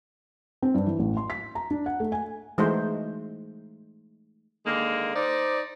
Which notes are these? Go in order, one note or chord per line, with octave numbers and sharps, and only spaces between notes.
C4
G2
E3
A1
C6
B6
A#5
D4
F#5
A3
G#5
E3 G#3 A3 D#4 F#4 C5
D3 D#3 G#3 A#3
D#4 C5 D5